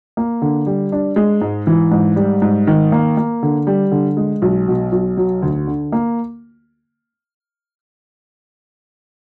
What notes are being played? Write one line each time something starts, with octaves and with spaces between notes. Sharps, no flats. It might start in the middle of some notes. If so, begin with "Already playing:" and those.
A#3
D3
G3
D4
G#3
G#2
E3
G#2
G3
G#2
D#3
A#3
A#3
D3
G3
D3
G#3
B1
B2
B1
F#3
D2
D3
A#3